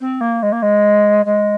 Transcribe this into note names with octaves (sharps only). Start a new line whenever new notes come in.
C4
A#3
G#3
A#3
G#3
G#3